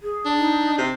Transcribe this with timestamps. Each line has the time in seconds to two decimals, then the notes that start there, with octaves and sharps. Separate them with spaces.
0.02 G#4
0.26 D4
0.38 D#4
0.78 C3